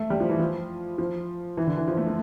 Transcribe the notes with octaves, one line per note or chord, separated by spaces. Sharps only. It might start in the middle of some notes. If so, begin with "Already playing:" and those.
Already playing: A3
G3
F3
E3
F3
F3
E3
D3
E3
F3
A3
A3